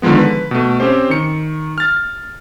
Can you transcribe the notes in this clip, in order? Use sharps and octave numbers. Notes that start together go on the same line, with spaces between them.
D3 D#3 F3 G#3 B3
B4
B2 A3
C4 C#4 G4 C5
D#3 C#7
F6 A6